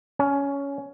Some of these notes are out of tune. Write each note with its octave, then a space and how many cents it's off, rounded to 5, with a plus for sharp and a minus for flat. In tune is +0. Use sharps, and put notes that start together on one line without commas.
C#4 +15